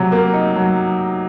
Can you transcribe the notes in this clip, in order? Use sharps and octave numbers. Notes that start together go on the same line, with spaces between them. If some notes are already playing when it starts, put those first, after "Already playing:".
Already playing: C3 F#3
A#3
D#4
F#3